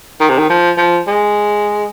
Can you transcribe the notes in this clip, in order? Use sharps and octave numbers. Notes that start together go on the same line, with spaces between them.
D#3
C3
D#3
F3
F3
G#3